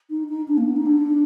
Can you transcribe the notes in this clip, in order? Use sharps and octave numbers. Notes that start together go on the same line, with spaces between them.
D#4
D#4
D4
A#3
B3
D#4
D4